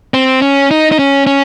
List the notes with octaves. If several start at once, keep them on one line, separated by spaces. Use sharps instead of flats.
C4
C#4
D#4
D#4
C#4
C#4